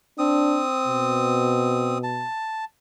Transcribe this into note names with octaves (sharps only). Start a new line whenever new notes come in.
C4 D4 D#6
B2
A5